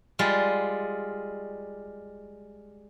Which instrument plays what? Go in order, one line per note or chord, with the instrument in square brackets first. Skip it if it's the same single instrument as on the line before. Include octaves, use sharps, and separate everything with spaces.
[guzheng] G3 G#3 F4